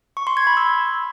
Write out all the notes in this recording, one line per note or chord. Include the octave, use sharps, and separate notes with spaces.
C#6
C6
G#6
B5
E6